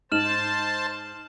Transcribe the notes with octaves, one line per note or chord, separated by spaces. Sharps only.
G#2 C5 A5 F6 E7 F#7